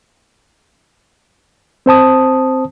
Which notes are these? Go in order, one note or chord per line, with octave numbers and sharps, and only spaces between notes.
C4 C5 A5 D#6